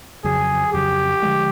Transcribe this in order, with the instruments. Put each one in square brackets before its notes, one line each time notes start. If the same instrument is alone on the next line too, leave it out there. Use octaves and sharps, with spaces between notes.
[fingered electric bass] F2 C#3 F#3 [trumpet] G#4
[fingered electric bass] F2 C#3 F#3 [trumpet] G4
[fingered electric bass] D3 F3 G#3